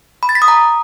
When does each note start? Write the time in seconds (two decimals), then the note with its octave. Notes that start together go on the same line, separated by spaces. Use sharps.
0.23 B5
0.29 A6
0.35 B6
0.42 D#6
0.48 A#5